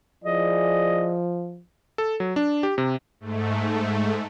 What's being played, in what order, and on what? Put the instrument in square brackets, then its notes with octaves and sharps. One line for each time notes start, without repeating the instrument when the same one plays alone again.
[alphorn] F3 [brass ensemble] E4 G#4 D5 [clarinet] D#5
[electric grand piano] A4
F#3
D4
G4
C3
[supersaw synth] G#2 A3